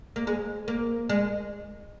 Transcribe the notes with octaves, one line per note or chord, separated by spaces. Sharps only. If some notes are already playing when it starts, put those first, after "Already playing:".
A#3
G#3
A#3
G#3